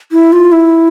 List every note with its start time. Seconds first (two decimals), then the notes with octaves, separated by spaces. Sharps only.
0.12 E4
0.33 F4
0.52 E4